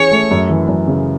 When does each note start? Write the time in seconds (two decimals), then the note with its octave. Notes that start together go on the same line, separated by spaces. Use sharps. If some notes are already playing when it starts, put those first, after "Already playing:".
Already playing: E3 C#4 G#4 C#5
0.11 A3
0.31 F#2
0.49 E3
0.68 F#2
0.88 C#3